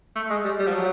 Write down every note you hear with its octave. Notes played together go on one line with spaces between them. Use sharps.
A3
G#3
G3
G3
F3
F#3